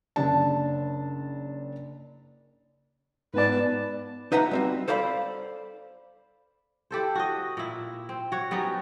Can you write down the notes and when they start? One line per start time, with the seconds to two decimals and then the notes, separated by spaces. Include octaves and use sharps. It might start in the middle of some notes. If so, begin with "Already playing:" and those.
0.16 F#1 D4 A5
3.34 G#2 B3 B4 D5 A5
4.32 D#4 B4 E5 F#5 A#5
4.51 G3 C4 F#4
4.88 A4 C5 D5 F5 A#5 B5
6.91 E4 G4 A4 C5
7.15 F#4 D#5
7.57 A#2 E4
8.09 C4
8.32 F#4 C#5
8.51 G3 B3 C#4 D#4